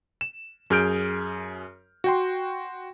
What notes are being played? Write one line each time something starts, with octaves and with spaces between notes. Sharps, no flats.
E7
F#2 G#4 F6 G6 D7
F#4 G5 C6